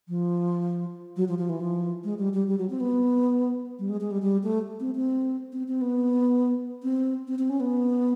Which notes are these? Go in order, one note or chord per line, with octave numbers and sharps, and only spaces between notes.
F3
F#3
F3
F3
E3
F3
G#3
G3
G3
G3
F#3
C4
B3
G3
G#3
G#3
G3
G3
A3
C4
C4
C4
C4
B3
C4
C4
C4
C#4
B3